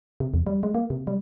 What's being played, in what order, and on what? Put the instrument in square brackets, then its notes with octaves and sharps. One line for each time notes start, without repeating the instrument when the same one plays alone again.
[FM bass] C3
E2
G3
G#3
A#3
C3
G3